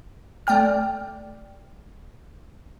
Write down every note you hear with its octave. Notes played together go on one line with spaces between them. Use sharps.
A3 D5 G5 F6